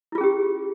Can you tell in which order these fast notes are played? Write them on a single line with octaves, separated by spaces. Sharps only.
E4 F4 G#4 C#4 G4